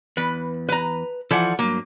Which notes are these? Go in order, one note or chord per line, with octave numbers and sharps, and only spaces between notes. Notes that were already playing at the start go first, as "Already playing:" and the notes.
E2 B4
B4 A#5
E3 F3 A4 D5 F#5
G2 F#3 A#3